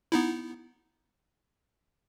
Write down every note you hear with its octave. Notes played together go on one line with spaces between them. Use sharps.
B3 D#4 E4